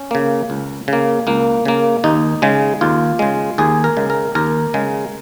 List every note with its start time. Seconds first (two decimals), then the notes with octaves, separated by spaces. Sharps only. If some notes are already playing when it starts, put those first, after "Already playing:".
Already playing: C#4
0.11 C#3 A#3
0.50 C#2
0.88 C#3 A#3
1.27 C#2 A#3
1.65 C#3 A#3
2.04 D#2 D#4
2.42 C#3 G#3
2.81 D#2 F4
3.19 C#3 G#3
3.58 D#2 G#4
3.84 A#4
3.97 C#3 G#3
4.10 A#4
4.35 D#2 A#4
4.74 C#3 G#3